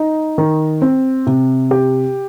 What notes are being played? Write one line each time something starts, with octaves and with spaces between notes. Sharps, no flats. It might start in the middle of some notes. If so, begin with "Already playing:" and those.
Already playing: D#4
D#3
C4
C3
G4